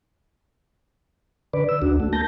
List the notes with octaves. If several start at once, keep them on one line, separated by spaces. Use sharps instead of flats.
D3 B4 D5
E6
D2 D4 F#4
A3
A#3 A5 G6 A#6